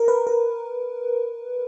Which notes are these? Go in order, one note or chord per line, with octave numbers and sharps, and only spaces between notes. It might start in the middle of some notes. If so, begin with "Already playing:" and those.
Already playing: A#4
B4
A#4